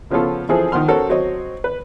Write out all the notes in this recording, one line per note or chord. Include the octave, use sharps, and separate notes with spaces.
C#3 F3 B3 C#4 F4 A4
E3 F3 C4 G#4 A4 C5
D#3 F3 F#5 C6 F6
C#4 F#4 A4 A#4 C5
F#3 C4 C#5 D#5
B4